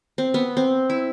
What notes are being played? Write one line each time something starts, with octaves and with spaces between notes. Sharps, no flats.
C4
B3
C4
E4